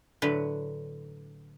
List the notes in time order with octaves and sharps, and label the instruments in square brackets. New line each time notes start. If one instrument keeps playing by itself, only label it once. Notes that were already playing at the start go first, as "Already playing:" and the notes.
[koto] A2 D3 F#3 B4